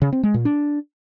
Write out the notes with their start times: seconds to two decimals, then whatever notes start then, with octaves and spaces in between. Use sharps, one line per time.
0.02 C#3
0.13 C4
0.23 G#3
0.34 A#2
0.45 D4